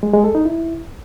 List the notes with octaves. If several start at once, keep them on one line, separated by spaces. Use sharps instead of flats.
G#3
G#3
A4
D#4
E4